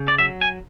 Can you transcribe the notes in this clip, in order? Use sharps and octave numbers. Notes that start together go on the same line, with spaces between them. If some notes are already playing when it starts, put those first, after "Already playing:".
Already playing: C#3
D5
F#3 E5
G#5